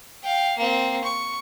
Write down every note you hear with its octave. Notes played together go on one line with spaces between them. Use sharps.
F5 G5
A#3 C4
C#6